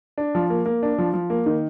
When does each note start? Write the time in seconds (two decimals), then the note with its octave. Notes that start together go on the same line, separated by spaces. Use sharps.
0.18 D4
0.35 F3
0.50 A#3
0.66 A#3
0.83 D4
0.98 F3
1.13 F3
1.30 A#3
1.46 D#3